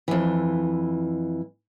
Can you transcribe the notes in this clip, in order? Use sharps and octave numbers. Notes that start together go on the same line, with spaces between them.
F2 E3